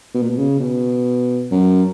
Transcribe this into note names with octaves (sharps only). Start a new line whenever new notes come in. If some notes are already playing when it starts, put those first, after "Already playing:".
B2
A#2
B2
C#3
B2
F#2